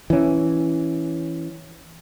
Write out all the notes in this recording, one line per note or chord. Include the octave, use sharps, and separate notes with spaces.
E3 C#4